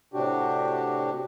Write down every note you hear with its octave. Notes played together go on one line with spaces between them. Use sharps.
A2 C3 D4 F#4 G4